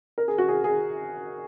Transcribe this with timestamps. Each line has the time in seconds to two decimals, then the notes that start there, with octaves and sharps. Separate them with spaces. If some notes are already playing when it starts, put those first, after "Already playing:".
0.18 A#4
0.28 G#4
0.38 F#4
0.48 G#4
0.64 G#4